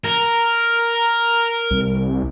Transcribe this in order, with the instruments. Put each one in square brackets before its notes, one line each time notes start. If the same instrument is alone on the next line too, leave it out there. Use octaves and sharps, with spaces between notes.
[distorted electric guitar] A#4
[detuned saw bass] C2